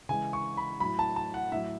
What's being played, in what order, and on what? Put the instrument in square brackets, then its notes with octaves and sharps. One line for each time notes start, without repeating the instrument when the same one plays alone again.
[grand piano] C#3 E3 G#3 G#5
C#6
B5
A2 F#3 B5
A5
A5
F#5
A2 F#3 E5